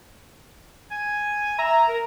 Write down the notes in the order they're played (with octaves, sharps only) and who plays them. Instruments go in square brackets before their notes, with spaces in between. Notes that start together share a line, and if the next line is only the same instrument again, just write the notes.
[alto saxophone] G#5
[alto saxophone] E5 [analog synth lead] A#5
[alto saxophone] A#4